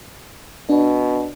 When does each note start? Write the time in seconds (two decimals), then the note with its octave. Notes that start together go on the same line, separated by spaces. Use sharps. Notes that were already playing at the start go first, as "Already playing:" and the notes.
0.69 B2 D4